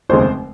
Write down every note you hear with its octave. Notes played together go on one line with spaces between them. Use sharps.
F1 D#2 C#3 G#3 C4 C5